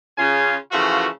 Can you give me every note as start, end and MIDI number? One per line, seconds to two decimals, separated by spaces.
0.18 0.56 49
0.18 0.56 65
0.18 0.56 80
0.72 1.07 49
0.72 1.07 52
0.72 1.07 53
0.72 1.07 57
0.72 1.07 65
0.72 1.07 66